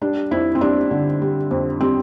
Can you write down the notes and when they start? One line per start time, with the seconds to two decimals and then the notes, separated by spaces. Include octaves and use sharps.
0.01 G3 D4
0.31 F2 E4
0.55 C4
0.61 G3 D4
0.91 D3
1.22 G3
1.51 F2
1.80 G3 C4